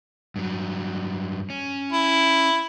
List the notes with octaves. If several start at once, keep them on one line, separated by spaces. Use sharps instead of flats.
G2 F#3
C#4
E4